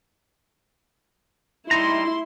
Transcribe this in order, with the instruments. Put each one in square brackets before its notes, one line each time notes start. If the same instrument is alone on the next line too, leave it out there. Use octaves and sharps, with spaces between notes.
[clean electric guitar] G3 D#4 A#5 [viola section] E4 C6